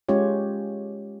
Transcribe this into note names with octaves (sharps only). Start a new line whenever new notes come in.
G#3 C#4 F4 G4 C#5